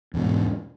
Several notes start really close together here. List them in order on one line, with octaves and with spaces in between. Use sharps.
E2 B2 G#2